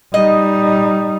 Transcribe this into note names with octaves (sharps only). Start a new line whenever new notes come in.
G3 D#4 D#5